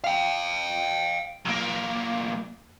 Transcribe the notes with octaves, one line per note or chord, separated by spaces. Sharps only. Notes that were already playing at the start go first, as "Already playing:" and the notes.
F5 G5
B1 A#3